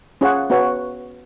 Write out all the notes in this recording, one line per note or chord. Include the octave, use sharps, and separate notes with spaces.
C#4 F4 G#4 C#5 F#5
B3 F#4 C#5